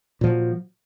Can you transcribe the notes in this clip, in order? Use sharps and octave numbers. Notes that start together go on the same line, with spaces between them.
A#2 F3 F#3